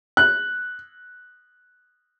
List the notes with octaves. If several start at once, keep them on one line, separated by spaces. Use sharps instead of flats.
F#6